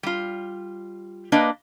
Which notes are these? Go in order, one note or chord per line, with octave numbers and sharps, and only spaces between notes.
G3 F4
A#3 D4 B4 D#5